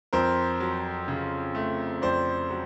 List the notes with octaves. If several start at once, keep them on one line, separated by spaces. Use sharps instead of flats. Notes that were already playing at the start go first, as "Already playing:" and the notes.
F2 A#4 C5
F#3
C#3
A3
F2 C5 D5
F#3